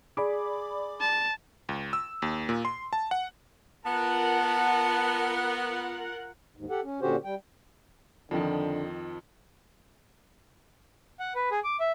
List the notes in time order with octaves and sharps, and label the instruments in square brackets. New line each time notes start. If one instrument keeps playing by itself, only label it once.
[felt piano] G#4 [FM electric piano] D5 B5 D6
[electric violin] A5
[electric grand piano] C#2
E6
D#2
A#2
C6
A5
F#5
[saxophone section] B3 [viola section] F4 A#4 F#5 [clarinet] A5
[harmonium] D#2 G#2
G4 A4 F#5
C#4
A#2 D3 C#4 F#4 G4 C5
G3 G5
[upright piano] F2 D#3 F3 [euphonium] D3
[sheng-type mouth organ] F#5
B4
G#4
D6
E5